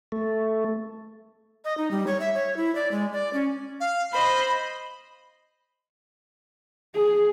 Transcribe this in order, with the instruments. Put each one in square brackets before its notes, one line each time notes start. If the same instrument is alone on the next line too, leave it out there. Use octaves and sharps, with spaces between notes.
[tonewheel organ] A3
[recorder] D#5
D#4
G3
C#5
E5
C#5
E4
D5
G#3
D5
C#4
[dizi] F5
[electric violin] C5 D#5 [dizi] B5
[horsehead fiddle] G#4